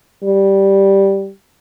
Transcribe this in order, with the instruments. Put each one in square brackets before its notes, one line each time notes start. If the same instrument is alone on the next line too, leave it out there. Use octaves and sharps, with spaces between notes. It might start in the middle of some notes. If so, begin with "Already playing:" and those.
[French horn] G3